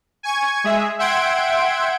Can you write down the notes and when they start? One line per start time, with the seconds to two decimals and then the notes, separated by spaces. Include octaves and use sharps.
0.23 G#5 C#6 G#6
0.64 G#3 G#4 E5
0.99 E5 F#5 G5 C6 G#6 D7